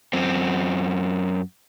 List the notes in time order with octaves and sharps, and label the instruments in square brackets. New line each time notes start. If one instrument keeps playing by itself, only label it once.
[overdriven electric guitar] F#2 C4